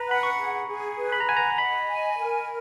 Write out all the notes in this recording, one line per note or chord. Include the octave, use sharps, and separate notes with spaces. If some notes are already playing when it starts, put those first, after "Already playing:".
Already playing: B4 A#5
F#5 B5
C#6
G#4
G#4
B4
B5
A#5
F#5 G#5
A#5
D#5 B5
G#5
A#4